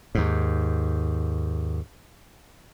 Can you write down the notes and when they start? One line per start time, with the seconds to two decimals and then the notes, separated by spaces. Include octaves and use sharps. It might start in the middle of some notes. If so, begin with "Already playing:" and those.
0.15 D#2 G#2